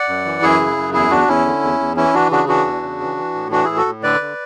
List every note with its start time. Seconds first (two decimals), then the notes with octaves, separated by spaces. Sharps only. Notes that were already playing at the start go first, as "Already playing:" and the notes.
Already playing: D5 F#5
0.08 F#2
0.25 E3
0.42 F#2 E4 G#4
0.60 C#3
0.77 F#2
0.93 E2 E4 G#4
1.11 E2 D4 F#4
1.28 E2 C#4 E4
1.46 D3
1.63 E2
1.80 E2
1.97 E3 C#4 E4
2.14 E3 D4 F#4
2.31 C#3 D4 F#4
2.48 E3 D4 F#4
2.65 E2
2.82 C#3
3.01 E3
3.17 E3
3.34 A2
3.51 E3 D4 F#4
3.64 A2 E4 G#4
3.77 F#4 A4
3.86 A2
4.03 D3 B4 D5
4.21 D3